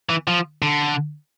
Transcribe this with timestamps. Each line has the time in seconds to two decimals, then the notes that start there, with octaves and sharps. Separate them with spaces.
0.09 E3
0.28 F3
0.62 D3